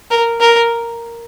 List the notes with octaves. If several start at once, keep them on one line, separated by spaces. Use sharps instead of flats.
A#4
A#4